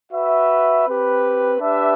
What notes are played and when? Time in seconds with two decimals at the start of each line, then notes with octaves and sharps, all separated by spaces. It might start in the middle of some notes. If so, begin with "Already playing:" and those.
0.12 F#4 B4 E5
0.86 C4 G4 B4
1.59 D4 G4 B4 E5